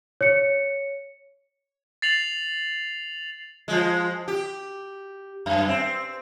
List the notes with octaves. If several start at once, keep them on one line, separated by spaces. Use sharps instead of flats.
C#5 C#7
A6 C7 F7 F#7
F3 G#3
G4
F#2
C4